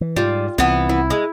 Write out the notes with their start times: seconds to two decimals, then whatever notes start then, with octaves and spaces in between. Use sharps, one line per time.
0.01 E3
0.16 G#2 G3 F4
0.58 C2 E3 B3 C4
0.89 E4
1.10 G#3